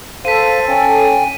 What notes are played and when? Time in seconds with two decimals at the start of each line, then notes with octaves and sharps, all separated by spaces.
0.25 A4 C5 F5 B6 D#7
0.68 C#4 G5 G#5